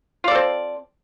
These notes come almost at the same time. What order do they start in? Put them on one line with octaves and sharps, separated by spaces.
F4 D5 A4 C4